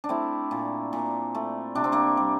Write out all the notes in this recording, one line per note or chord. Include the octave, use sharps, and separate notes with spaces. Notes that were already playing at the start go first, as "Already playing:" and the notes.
D4
A3 C4 E4
A#2
A#2
A3
C3 D4
C4
A#3 D4
G3